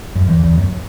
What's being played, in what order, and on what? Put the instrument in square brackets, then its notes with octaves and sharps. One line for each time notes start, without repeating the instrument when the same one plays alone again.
[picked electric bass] F#2
E2
E2
F#2